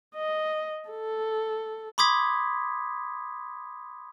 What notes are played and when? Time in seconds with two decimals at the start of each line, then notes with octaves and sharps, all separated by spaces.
0.15 D#5
0.89 A4
1.98 B5 C6 D6 D#6 G#6 B6